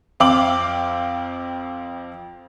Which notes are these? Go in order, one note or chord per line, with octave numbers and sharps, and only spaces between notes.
F2 C4 F5 G5 D6 F#7